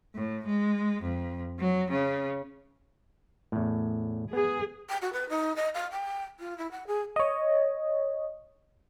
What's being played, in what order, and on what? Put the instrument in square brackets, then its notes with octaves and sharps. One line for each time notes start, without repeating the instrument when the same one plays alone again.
[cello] A2
G#3
F2
F#3
C#3
[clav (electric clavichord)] E2 A2
[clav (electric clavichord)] B3 [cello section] G#4
[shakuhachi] G5
F#4
B4
D#4
D#5
F5
G5
F4
E4
F#5
G#4
[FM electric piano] C#5 D#5